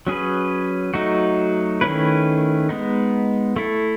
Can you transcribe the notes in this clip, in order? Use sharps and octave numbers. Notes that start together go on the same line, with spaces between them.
F#3 C#4 G#4 B4
F#3 A3 D#4 F#4
D#3 A3 C#4 E4 B4
G#3 B3 D#4
A3 E4 A4